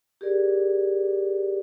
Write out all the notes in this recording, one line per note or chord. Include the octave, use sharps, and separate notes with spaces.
G4 G#4 A#4 D5